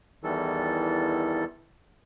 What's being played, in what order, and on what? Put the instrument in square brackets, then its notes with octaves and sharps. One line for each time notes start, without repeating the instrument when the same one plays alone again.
[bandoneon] E2 D#3 E3 G3 A4